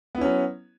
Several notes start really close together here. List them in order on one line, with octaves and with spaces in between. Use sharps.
B3 E4 C#4 F#3